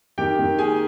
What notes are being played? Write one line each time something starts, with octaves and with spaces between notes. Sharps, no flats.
D#3 G4 G5
D#3
A#3 G#4 G#5